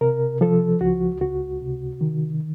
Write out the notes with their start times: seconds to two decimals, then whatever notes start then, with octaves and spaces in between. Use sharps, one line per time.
0.01 C3 A#4
0.41 F3 A4
0.81 C#2 F#4
1.21 C#2 F#4
1.62 C3
2.01 D#3